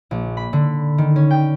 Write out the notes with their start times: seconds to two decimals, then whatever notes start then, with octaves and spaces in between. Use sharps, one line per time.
0.11 A#1
0.37 B5
0.53 D3
0.98 D#3
1.16 C#4
1.31 G5